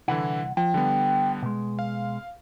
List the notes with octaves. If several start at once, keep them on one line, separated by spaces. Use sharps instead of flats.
C2 D3 E3 E4 F#5
F3 G5
D3 G3 B3
B2 G#3
F5